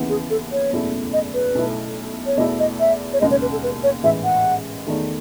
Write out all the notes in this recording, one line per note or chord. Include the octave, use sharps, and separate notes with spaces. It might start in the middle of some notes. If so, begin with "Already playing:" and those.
Already playing: D#2 C#3 E3 B3 E4
G#4
A4
C#5
F#1 E2 B2 A3 E4
D#5
B4
B1 B2 A3 E4
C#5
E2 B2 A3 E4 A4 D#5
D#5
E5
C#5
E1 D#2 C#3 G#3 D#5
C#5
B4
A4
B4
C#5
A1 G#2 E3 G#3 E5
F#5
E2 D#3 A3